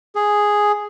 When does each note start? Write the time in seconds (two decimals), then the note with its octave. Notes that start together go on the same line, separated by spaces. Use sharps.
0.15 G#4